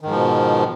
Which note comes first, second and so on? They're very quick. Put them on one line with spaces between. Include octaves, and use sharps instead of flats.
D#3 G#2 F3 B2